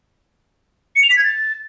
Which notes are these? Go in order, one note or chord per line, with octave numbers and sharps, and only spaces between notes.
C#7
F7
B6
G#6
A6